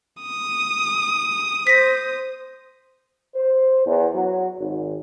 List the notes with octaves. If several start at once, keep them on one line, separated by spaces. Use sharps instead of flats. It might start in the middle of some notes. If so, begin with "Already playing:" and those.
D#6
C5 A#6 B6
C5
E2
F#3
G#1